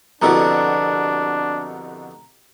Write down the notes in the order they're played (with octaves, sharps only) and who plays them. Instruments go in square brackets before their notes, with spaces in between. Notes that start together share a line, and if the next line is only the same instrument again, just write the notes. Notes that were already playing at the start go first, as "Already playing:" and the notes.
[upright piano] C2 E4 F#4 [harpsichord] F2 B2 D3 [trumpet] D4 [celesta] A#5